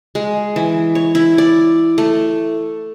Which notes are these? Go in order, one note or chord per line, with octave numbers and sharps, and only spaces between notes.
G#3
E3
C#5
E4
D5
A3